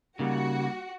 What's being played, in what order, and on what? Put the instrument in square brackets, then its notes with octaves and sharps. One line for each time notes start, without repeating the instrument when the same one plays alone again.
[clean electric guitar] C#3 [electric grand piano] G3 A#3 D#4 [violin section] F#4